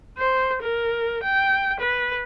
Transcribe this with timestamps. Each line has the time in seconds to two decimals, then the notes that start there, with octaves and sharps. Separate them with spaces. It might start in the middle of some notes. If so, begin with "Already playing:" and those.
0.18 C5
0.62 A#4
1.23 G5
1.80 B4